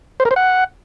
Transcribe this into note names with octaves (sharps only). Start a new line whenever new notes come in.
C5
A#4
C5
F#5